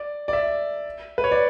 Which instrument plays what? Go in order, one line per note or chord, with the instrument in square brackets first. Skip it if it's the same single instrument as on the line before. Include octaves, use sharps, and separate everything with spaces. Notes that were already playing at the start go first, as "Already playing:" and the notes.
Already playing: [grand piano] D5
D5
E5
B4
C#5
D5